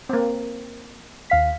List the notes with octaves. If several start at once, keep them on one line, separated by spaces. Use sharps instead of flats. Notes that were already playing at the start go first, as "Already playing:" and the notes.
A#3 C4
D#2 F5 B6